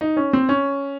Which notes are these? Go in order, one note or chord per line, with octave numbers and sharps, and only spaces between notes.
D#4
C#4
C4
C#4